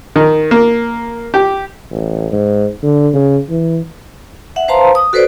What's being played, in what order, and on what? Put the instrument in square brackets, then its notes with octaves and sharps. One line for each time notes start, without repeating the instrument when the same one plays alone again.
[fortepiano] D#3
A#3
G4
[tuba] A1
G#2
D3
C#3
E3
[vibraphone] E5 F#5
B4 C5 F5 A5 A#5 C6
D#6
F#4 A4 B4 C5 D5